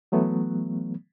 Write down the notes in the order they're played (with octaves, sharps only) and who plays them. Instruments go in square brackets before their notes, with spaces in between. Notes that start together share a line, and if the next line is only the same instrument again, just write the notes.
[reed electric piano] E3 F#3 A3 B3